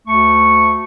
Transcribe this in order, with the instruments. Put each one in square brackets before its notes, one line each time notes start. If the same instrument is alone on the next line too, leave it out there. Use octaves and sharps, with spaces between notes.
[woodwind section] D2 A3 C#6